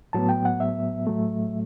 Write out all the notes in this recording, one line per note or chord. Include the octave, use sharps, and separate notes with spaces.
A2 F#3 B3 A5
G5
F#5
E5
A2 F#3 A3